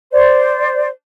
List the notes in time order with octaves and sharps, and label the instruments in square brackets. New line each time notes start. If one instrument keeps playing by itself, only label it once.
[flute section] C5 D5